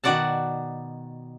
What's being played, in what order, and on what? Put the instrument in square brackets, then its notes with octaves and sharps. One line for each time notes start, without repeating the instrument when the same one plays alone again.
[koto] B2 D#3 F#4 D5 F#5 A5